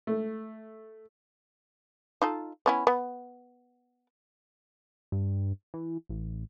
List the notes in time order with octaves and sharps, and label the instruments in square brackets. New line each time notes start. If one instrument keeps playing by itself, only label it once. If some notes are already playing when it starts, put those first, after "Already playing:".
[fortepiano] A3
[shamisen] D#4 F4 A4
B3 C#4 E4
B3
[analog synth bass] G2
E3
A1